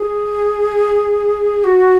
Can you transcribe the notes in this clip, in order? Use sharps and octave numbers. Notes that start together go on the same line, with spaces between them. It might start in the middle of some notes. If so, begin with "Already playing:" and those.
Already playing: G#4
F#4